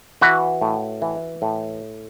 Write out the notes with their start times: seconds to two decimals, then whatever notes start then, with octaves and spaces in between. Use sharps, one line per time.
0.21 E3 F#4 B4
0.62 A2
1.02 E3
1.42 A2